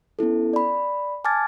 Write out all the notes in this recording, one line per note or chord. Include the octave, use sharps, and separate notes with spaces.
B3 C#4 E4 A4
D5 B5
G#5 A5 D6 F6 G#6 A6